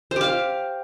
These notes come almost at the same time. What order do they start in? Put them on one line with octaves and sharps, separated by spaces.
C5 G4 F5